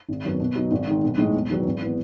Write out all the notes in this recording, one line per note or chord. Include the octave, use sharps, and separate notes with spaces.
G#1
F#2 D#3 F#3 B3
B2
F#3 B3 D#4
G#1
G#2 D#3
B1
A2 E3 G#3 D#4
E1
E2 D#3 F#3 B3
G#1
E3 B3